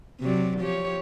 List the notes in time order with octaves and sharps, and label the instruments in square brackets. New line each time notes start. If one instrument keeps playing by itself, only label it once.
[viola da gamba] C3 F#3 D5
F3 G4 C#5